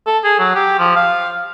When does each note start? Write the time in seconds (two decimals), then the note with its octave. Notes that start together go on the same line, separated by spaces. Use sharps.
0.07 A4
0.24 G#4
0.39 F#3
0.55 G4
0.79 F3
0.96 F5